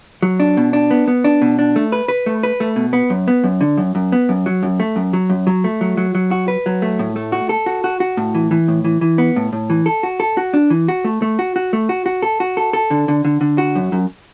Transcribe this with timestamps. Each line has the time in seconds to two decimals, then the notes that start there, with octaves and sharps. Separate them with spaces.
0.23 F#3
0.40 D4
0.57 B2
0.73 D4
0.91 B3
1.08 B3
1.24 D4
1.42 B2
1.59 D4
1.76 A3
1.92 B4
2.08 B4
2.26 A3
2.43 B4
2.60 A3
2.76 B2
2.93 B3
3.10 F#2
3.28 B3
3.44 F#2
3.61 D3
3.77 F#2
3.95 F#2
4.12 B3
4.29 F#2
4.46 F#3
4.63 F#2
4.80 A3
4.96 F#2
5.13 F#3
5.30 F#2
5.47 F#3
5.64 A3
5.81 F#3
5.97 F#3
6.15 F#3
6.31 F#4
6.48 B4
6.66 F#3
6.82 A3
6.99 A2
7.16 A3
7.32 F#4
7.49 A4
7.66 F#4
7.84 F#4
8.00 F#4
8.17 A2
8.34 E3
8.51 E3
8.68 A2
8.84 E3
9.01 E3
9.18 B3
9.36 A2
9.53 A2
9.70 E3
9.86 A4
10.03 F#4
10.20 A4
10.37 F#4
10.54 D4
10.70 E3
10.88 F#4
11.04 A3
11.22 A3
11.39 F#4
11.56 F#4
11.73 A3
11.89 F#4
12.06 F#4
12.22 A4
12.40 F#4
12.57 A4
12.73 A4
12.91 D3
13.08 D3
13.25 D3
13.41 D3
13.58 F#4
13.75 F#2
13.92 F#2